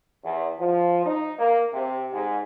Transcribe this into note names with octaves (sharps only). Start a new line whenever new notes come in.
E2
F3
D#4
A#3
C3
G#2